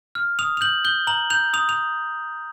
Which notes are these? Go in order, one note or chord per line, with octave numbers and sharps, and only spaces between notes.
F6
D#6 F7
F7
G6 F#7
G6 G7
A#5 F#7
G6 F7
D#6 F7
F7